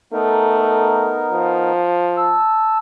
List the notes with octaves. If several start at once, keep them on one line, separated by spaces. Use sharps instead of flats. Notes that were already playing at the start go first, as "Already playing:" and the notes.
A3 B3 D#4 A#4
F3
A5 E6